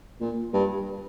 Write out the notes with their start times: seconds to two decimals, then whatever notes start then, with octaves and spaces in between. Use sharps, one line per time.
0.21 A#2
0.53 G2